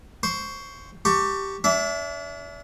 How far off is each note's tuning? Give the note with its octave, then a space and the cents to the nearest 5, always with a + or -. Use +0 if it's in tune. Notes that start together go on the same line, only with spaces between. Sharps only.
C5 +0 C#6 +15
G4 -5 A5 +30 C#6 +0
D4 -40 E5 +0